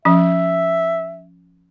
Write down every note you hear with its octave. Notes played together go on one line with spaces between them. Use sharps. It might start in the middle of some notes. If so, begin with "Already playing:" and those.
F3 C#4 E5